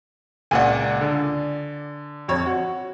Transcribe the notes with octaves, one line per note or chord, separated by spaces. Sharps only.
C#2 A#2 D5 F#5 G#5
D3
F2 C#5
F#4